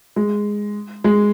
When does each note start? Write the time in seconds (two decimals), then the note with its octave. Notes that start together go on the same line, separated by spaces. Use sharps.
0.16 G#3
1.04 G#3